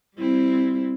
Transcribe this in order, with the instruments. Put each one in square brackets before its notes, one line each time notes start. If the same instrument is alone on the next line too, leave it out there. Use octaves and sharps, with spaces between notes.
[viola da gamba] G3 C4 E4